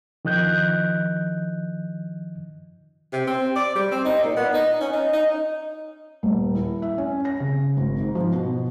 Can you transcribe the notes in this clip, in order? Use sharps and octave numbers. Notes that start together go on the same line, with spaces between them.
D#3 F3 D#5 F#6 G6
C3
C4
D5
G3
C4
D#4
A#2
B3
D#4
C#4
D#4
D#4
D#1
E4
E5
C#4
A#6
C#3
G#1
G#2
F3
B2